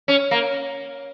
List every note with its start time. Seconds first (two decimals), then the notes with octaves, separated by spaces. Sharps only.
0.08 C#4
0.31 A#3